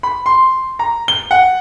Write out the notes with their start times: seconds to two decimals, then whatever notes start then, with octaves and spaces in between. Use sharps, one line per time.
0.03 B5
0.26 C6
0.79 A#5
1.08 G7
1.31 F#5